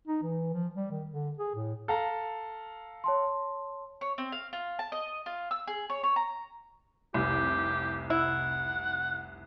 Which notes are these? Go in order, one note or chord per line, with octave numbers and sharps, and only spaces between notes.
D#4
E3
F3
G3
D#3
D3
G#4
A2
A4 F5 A#5
C#5 A5 C6
C#5
C4
F5
F4
A5
D#5
F4
E6
G#4
C#5
C#5
A#5
F1 C2 G4
E4 F#5